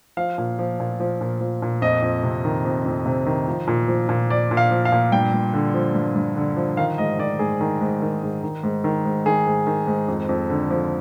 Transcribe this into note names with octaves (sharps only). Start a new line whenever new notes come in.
F3 F5
A#2
F3
A#2
F3
A#2
F3
A#2
F2 D#5
F2
C3
D#3
F2
F2
C3
D#3
F3
A#2
F3
A#2
F3 D5
A#2
F5
F3
F5
A#2
G2 G5
G2
D3
F3
G2
G2
D3
F3
D#3 F5
G#2 D#5
D#3 D5
G#2 G#4
D#3
G#2
D#3
G#2
D#3
G#2
D#3
G#2
D#3 G#4
G#2
D#3
G#2
F2
F2
D3
F3